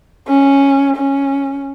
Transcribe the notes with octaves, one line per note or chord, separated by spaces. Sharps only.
C#4
C#4